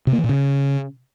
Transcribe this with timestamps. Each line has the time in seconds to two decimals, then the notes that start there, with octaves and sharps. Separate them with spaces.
0.07 C3
0.13 A#3
0.18 E3
0.24 A#2
0.29 C#3